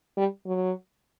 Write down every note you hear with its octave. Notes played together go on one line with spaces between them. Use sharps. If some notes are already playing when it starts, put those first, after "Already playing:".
G3
F#3